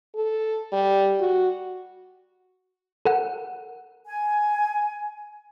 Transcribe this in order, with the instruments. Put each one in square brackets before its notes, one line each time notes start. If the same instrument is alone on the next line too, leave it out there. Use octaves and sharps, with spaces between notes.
[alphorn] A4
G3
F#4
[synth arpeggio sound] A4 A#4 F#5
[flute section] G#5